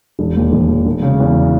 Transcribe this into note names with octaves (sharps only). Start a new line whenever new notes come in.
E1
D#2
E1
E1
E1
C#3
E2